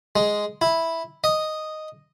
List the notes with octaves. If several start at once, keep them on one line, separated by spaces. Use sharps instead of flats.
G#3
E4
D#5